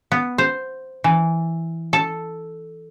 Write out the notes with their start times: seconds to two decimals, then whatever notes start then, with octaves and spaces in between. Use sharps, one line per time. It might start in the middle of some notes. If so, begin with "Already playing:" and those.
0.12 B3
0.38 C5
1.04 E3
1.93 A4